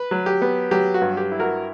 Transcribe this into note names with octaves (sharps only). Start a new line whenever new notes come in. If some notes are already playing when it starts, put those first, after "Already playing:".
Already playing: B4
F#3
G4
B3
F#3 G4
F#4
G2
G4
E4
F#4 A#4